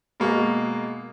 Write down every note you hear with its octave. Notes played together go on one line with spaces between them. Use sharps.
B2 G#3 A#3